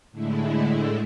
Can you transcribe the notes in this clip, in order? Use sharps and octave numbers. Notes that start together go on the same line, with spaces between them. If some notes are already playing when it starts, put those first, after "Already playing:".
A2 D3 G#3 A3 E4